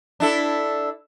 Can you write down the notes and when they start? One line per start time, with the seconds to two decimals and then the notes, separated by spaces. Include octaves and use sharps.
0.20 D4 E4 A4